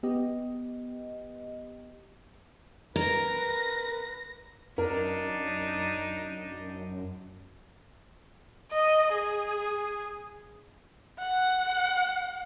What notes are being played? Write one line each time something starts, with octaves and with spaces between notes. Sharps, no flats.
B3 G4 D#5
A#4 B4 A#6
F#2 D4 D#4 A#4
D#5
G#4
F#5